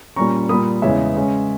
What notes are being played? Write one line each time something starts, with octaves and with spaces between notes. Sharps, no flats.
A#2 G3 C#4 A#5 C#6
A#2 G3 A#3 B5 D#6
E2 C#3 E3 G#3 C#5 E5
C#3 G#3 C#4